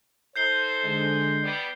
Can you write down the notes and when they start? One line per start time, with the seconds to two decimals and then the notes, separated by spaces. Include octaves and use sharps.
0.36 D#4 A4 C5 G6 C7 G7
0.84 D3 G#3
1.43 G3 B3 D5